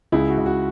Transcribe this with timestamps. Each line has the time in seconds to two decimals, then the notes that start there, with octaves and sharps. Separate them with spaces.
0.12 C#2 E4 G#4
0.29 F#4
0.37 C#2
0.46 F#4